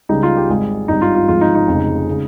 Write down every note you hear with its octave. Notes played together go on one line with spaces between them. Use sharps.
C#2 C#3 G3 D#4
F4
G4
G#1 G#2 G3 G#4
G#1 G2 G3 D#4
F4
F4
G#1 G#2 F3 G#3 F4
D#4
D#4
F1 F2 C#3 G#3
C#3 G#3